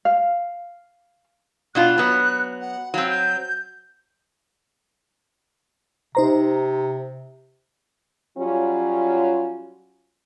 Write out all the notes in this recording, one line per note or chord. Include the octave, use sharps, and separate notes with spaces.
F5
B2 D4 F4 F#6
F#3 B3
F#5
F#3 C4 F5
G6
C3 D#4 C5 A#5
F#3 G3 C#4 F4